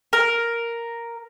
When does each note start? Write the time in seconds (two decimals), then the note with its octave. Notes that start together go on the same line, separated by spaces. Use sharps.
0.13 A#4